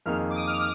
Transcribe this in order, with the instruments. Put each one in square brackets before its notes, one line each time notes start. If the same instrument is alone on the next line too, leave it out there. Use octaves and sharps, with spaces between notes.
[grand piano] F2 D#3 A#3 D#4 G#4 [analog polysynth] F6
[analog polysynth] D6
D#6
F6
D#6